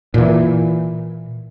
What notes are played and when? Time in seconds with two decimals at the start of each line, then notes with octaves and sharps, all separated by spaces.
0.14 A#2 E3